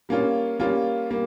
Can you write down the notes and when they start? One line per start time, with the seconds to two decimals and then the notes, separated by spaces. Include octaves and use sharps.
0.09 G3 A#3 C#4 F4
0.60 G3 A#3 C#4 F4
1.10 G3 A#3